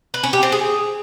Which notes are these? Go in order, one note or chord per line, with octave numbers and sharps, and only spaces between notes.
B4
C#4
G4
C4
G#4